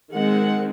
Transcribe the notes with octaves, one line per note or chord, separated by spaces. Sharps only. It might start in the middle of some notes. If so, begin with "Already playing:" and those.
D#3 G#3 C4 F#5